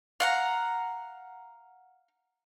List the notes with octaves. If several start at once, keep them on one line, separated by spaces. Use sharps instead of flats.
F5 F#5 A#5